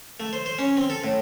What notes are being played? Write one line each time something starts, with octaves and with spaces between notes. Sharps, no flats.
A3
C5
C5
C#4
C4
A4
A2